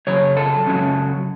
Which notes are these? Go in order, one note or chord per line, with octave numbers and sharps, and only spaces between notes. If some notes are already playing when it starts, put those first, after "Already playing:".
F#2 C#3 F#3 C#5
A4
F#2 C#3 F#3